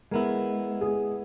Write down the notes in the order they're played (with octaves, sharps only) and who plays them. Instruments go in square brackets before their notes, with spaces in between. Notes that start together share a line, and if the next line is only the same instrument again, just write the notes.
[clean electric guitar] G#3 B3 E4 [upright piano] A#4
[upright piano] G#4